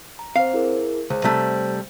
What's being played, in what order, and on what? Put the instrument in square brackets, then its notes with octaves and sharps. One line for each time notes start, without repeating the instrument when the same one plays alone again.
[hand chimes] A#5
[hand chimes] C4 C5 [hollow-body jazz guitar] F5
[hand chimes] E4 G#4 A#4
[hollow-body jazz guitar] C#2 [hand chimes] C5
[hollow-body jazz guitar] C3 G3 A3